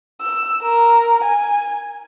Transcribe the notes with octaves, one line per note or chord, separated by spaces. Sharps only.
E6
A#4
G#5